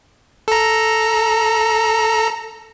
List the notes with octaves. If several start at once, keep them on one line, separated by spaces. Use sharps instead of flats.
A4 A#5